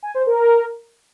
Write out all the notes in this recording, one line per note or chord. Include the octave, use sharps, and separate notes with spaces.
G#5
C5
A#4